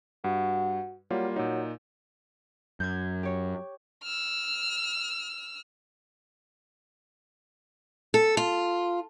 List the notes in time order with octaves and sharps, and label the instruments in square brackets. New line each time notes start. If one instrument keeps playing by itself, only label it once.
[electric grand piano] G2 [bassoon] F#4
[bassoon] F#3 [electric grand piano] G3 A#3 F4
[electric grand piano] A#2 D#4 [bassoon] F#3
[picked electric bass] F#2 [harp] G6 G#6
[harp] G4 C#5
[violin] E6 F6
[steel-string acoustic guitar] A4
F4